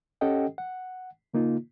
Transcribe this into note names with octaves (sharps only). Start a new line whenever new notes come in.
C#4 G4 A4 D#5 F#5 G5
F#5
C#3 A#3 D#4 F4